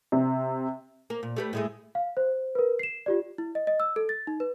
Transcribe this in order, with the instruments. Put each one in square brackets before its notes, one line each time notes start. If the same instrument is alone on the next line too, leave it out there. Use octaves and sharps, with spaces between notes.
[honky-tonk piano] C3
[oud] A#3
A#2
A3 G4 B4
A2 G#3 A3
[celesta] F5
C5
A#4 B4
C7 E7
F4 G4 D5
E4
D#5
D#5
E6
A4
A6
D#4
B4